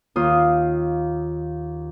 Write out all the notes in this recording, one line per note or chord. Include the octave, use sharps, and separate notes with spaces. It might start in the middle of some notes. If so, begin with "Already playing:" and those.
D#2 F4 D#6